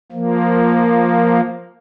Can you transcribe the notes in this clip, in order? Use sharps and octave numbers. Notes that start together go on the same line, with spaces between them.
F3 A#3